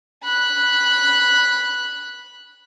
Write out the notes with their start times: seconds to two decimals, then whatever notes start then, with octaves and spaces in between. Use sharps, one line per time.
0.23 B5 F#6